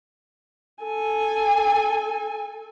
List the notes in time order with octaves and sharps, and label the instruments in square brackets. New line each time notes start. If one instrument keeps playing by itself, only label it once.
[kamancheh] A4 G#5